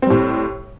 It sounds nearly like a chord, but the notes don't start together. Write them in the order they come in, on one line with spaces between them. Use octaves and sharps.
C4 G3 A2